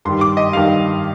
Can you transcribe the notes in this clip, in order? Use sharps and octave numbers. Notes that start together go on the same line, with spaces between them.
G2 D#3 G3 C6
D6
D#5
G2 D#3 G3 F5